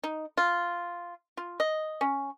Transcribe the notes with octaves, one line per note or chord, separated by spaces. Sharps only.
D#4
F4
F4
D#5
C#4